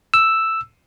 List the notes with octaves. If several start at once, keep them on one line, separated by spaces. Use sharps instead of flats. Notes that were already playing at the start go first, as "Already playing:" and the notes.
E6